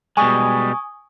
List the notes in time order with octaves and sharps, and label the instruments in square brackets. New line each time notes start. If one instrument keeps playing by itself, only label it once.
[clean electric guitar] B2 G3 G#3 [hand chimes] G#5 C#6 D#6